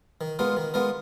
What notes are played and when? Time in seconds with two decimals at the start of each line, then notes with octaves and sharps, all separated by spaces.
0.21 D#3
0.39 G#3 B3 F4 A#4
0.57 D#3
0.74 G#3 B3 F4 A#4